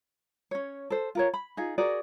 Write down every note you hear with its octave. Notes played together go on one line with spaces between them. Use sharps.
C#4 C#5
A4 C5
F4 A#4 C#5
B5
D#4 F4 G#4
F#4 G#4 A#4 D5